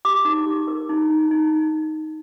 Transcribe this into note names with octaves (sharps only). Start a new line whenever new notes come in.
G4 D6
D#4
G4
A#4
D#4
D#4
D#4